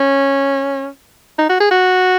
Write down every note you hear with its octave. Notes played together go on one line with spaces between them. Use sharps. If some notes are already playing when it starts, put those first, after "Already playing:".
Already playing: C#4
D#4
F#4
G#4
F#4